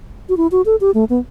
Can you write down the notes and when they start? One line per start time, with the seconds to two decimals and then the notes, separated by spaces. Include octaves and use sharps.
0.29 F#4
0.37 E4
0.52 F#4
0.66 A4
0.81 G4
0.94 A3
1.10 B3